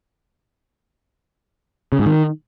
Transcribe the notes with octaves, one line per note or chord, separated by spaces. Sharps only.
C#3
G#2
D#3